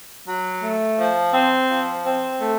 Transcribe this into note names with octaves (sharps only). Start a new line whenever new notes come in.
F#3
A3
F3
C4
F3
C4
A3